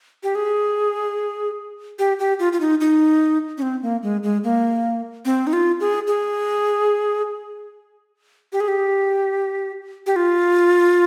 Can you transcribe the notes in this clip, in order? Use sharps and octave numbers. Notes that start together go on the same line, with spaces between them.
G4
G#4
G4
G4
F4
F4
D#4
D#4
C#4
C4
A#3
G#3
G#3
A#3
C4
D#4
F4
G#4
G#4
G4
G#4
G4
G4
F4